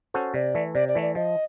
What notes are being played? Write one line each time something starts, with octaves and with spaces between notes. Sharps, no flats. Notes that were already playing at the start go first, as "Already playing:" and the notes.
C#4 F#4 A4 C5
C3 D5
E3 A3
C3 D5
D5
E3 A3
D5
F3 D#5